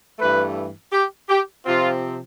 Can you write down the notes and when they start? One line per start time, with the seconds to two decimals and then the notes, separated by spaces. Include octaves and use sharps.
0.19 G2 E3 A3 B4
0.92 G4
1.29 G4
1.66 C3 F3 C4 F4